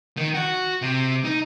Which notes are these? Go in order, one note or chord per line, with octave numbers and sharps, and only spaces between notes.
D#3
F#4
C3
D#4